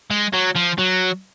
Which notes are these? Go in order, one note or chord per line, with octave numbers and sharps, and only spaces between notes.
G#3
F#3
F3
F#3